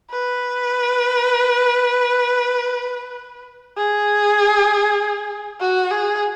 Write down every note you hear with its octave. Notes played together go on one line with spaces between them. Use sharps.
B4
G#4
F#4
G#4